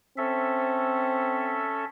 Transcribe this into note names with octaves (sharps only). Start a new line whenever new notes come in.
C4 C#4 A4 E5